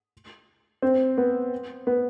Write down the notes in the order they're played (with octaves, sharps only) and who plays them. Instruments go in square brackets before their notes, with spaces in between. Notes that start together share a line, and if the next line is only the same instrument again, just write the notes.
[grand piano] C4
B3
B3